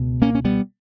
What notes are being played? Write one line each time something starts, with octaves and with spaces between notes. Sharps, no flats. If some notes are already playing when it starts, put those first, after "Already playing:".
Already playing: C#2 B2
A#3 C#4
C#4
G3 B3